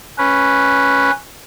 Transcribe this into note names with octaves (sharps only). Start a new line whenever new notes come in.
C#4 B4